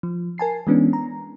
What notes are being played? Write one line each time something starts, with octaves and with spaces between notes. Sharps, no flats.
F3
A#4 G#5 A5 C7
E3 G#3 B3 C#4 D4
A#5